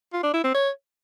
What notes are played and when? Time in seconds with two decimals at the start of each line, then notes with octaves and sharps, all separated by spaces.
0.13 F4
0.23 D4
0.34 E4
0.44 C4
0.54 C#5